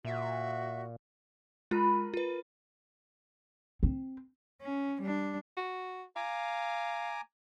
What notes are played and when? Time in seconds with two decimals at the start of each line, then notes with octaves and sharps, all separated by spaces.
0.05 A#2 F#4 E5
1.71 G#3 F4 A#4 B5
2.14 F4 B4
3.83 C4
4.62 C#4
5.01 G3 D4
5.57 F#4
6.16 F5 G#5 A#5 D6